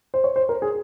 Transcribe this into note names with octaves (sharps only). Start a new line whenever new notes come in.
C5
C#5
C5
A#4
G#4